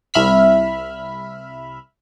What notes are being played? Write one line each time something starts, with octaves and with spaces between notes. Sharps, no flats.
C2 E5 B5 F6 B6